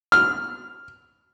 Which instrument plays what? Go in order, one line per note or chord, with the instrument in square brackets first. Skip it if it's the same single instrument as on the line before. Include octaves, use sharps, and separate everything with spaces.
[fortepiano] F6